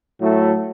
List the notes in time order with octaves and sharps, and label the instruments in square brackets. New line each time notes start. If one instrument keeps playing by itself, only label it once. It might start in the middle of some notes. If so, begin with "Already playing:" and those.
[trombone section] A2 F#3 A3